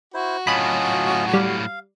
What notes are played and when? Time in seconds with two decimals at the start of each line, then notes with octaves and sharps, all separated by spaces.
0.14 E4 F#4 C5
0.47 A2 F#3 C#4 F4 D#5 B5 F#6 D#7
1.34 G3 F5